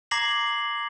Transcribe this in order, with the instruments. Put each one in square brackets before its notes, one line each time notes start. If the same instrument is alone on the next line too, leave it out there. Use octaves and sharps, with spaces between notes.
[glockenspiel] A#5 D6 G#6 A#6 C7 F#7